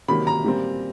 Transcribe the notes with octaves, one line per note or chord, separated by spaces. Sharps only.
C3 D#3 F#3 A#3 B5
A#5
A#2 G3 C4